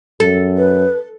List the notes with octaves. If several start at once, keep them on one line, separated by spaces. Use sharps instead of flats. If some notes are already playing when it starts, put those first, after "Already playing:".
F#2 A4
B4